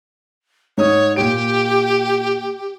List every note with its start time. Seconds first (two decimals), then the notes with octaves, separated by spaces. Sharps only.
0.78 G#2 C#5 D#6
1.16 A#2 G4 D7